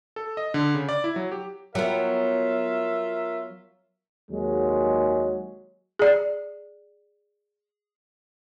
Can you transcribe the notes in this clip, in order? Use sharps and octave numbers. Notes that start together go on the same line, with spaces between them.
A4
D#5
D3
C#3
D5
E4
F#3
G4
F#3 B3 F4 A#4 E5
D#2 F#3 G#3
G#4 D5